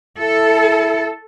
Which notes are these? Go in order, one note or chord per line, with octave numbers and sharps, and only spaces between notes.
E4 A4